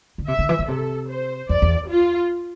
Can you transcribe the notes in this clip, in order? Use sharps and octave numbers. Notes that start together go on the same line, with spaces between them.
D3
C3 E5
D3
E3
E3
C3 A4
C5
F2 D5
E2
F4